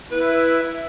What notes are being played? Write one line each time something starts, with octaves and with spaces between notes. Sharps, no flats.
E4 B4